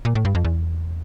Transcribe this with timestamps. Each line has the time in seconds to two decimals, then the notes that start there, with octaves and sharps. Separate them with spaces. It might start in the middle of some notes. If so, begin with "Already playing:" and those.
0.05 A#2
0.15 A2
0.25 G2
0.35 F2
0.45 E2